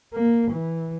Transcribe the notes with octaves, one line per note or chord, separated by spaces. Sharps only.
A#3
E3